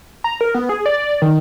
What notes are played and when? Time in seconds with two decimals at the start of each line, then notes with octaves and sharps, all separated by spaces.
0.24 A#5
0.41 A#4
0.55 B3
0.69 G#4
0.86 D5
1.22 D#3